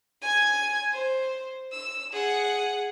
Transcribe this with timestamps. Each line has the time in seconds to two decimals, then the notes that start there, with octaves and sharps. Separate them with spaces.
0.22 G#5 G#6
0.92 C5
1.72 E6
2.13 G#4 F#5